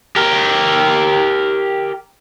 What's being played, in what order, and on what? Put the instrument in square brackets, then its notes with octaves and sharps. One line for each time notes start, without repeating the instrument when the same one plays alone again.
[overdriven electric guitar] G4 A#4